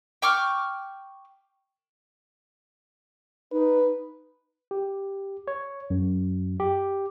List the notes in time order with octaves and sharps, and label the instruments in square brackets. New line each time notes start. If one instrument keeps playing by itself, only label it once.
[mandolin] G5 C#6 D6 F6
[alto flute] D#4 [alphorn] B4
[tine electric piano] G4
C#5
F#2
G4